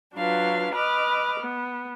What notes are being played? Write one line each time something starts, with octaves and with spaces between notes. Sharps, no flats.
F#3 D4 F4 B4 F5
B4 D#5 B5 D6 F6
B3